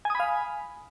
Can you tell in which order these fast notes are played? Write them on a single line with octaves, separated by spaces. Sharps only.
G#5 D#6 B5 F5